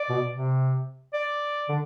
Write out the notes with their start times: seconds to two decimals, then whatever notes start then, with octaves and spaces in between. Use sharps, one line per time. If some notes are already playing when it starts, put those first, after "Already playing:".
Already playing: D5
0.09 B2
0.31 C3
1.13 D5
1.69 D3